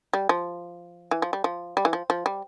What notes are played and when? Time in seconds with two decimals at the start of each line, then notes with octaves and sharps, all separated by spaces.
0.13 G3
0.29 F3
1.11 E3
1.22 F3
1.33 G3
1.44 F3
1.77 G3
1.85 E3
1.93 F3
2.10 F3
2.26 G3